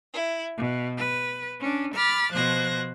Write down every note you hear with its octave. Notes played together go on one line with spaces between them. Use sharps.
E4
B2
B4
C#4 D4
B5 D6 F6 A6
B2 F3 C5 F#6 G#6 A#6